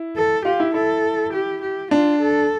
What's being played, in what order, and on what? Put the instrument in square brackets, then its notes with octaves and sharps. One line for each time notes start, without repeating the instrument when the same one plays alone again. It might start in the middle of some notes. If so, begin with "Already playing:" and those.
Already playing: [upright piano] E4
[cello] A4
[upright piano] F4 [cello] G4
[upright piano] E4
[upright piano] E4 [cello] A4
[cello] G4
G4
[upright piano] D4 [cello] F4
[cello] A4